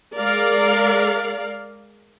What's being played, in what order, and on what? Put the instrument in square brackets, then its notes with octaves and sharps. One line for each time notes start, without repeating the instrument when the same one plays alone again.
[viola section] G#3 A#4 D5 F5